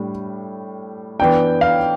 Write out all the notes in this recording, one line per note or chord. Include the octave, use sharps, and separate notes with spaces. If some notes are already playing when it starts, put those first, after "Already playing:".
Already playing: A2 G3 D4
E3 B3 D4 G5
F5